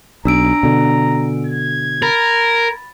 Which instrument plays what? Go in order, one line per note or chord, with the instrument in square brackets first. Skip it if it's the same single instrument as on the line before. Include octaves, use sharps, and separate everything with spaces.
[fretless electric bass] B1 [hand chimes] D4 E6 D7 [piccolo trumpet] A#5
[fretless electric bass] B2 D3
[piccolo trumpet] G#6
[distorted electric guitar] A#4 [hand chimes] B5 A6